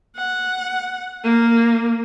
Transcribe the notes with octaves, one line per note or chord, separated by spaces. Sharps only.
F#5
A#3